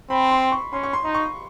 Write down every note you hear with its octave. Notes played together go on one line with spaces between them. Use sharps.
C4 B5
C6
C#6
C#4 C6
C#6
C6
D#4
C#6